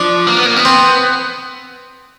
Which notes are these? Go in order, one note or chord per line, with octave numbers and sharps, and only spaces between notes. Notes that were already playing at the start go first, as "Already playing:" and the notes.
Already playing: F3 D4
A#3
B3
A#3
B3
C4